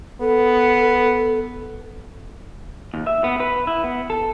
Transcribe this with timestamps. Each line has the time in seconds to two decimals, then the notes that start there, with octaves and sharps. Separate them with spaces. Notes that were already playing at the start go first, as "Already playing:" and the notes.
0.21 B3 A4
2.94 D#2
3.07 E5
3.24 B3
3.40 B4
3.67 E4
3.84 B3
4.10 A4